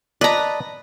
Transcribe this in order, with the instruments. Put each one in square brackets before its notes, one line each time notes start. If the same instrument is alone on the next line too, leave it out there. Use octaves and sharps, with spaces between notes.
[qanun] B4 A#5 [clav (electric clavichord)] D5 D#5 A5